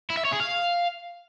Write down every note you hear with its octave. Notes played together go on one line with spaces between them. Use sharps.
E4
E5
C#5
G#4
F5